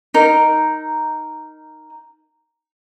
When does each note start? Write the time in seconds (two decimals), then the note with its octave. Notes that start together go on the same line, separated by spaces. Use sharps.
0.14 D#4 A#4